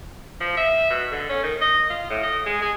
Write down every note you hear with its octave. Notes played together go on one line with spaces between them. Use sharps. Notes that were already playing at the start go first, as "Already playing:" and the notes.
F3
E5
B2
D3
C#4
D#3
D#5
F4
A2
D#5
G#3
G#4